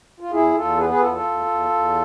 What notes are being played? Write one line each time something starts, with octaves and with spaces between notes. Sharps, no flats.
F4
E2 E4 G#4
E2 F4 A4
B3 G#4 B4
G#4 B4
E2 F4 A4
F4 A4
E2
E2
E2